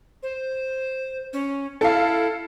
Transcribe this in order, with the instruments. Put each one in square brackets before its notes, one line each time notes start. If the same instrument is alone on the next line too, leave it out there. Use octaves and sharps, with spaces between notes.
[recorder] C5
C#4
[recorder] E4 [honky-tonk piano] A4 F5